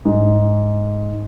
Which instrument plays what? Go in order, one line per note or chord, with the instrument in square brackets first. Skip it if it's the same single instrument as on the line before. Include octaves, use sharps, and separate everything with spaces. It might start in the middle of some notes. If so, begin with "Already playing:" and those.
[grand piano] G#2